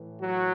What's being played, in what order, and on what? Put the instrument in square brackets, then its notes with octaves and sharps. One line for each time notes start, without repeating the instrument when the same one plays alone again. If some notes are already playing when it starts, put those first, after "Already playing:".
Already playing: [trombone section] A2 E3
F#3 F#4